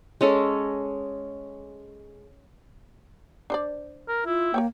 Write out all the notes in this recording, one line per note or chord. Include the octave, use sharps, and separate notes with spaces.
G#3 C#4 A4
D4 C5 D5
A#4
E4 F4
A#3 A#4 C#5 G5